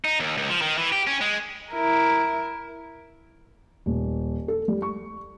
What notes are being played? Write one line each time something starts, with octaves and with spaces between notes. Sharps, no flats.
D#4
D#2
C#2
F3
D#3
E3
G4
C#4
G#3
E4 A#4
D#1
A4
G3
C#6